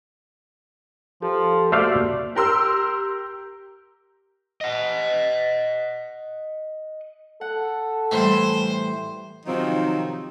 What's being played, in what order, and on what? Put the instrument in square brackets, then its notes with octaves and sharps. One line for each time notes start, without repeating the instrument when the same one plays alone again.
[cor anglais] F3 [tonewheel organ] G4 A4
[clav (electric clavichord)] A3 C5 F5 [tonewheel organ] A#3 F#4 [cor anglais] D5
[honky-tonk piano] G4 A#4 C6 E6
[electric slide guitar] D#5 F#5
[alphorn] A4 [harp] F#5
[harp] A2 E3 G3 [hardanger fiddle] C5
[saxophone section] C3 D#3 F3 F#3 C4 D#4